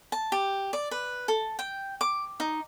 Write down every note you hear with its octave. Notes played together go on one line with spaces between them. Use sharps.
A5
G4
D5
B4
A4
G5
D6
D#4